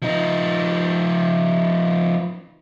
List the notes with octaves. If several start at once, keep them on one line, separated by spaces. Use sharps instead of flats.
F3 D#4